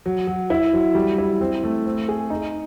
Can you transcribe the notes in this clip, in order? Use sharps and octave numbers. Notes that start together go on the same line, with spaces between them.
F#3
F#3
E4
F#3
G3
E4
C4
A3
C4
G#4
D#4